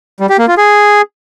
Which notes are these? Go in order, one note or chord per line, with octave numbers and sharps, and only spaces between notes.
G3
G4
A#3
F4
G#4